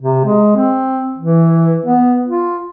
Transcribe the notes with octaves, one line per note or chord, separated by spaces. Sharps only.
C3
G#3
C4
E3
B3
F4